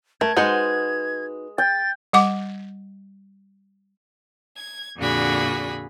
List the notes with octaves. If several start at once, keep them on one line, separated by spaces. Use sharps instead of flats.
A3 A#4 G#6
G#3 D#4 F#4 B4 C5 F#5
G5 A6
G3 F#5 D6
G#6
F2 A#2 D3 F#4 G#4 B5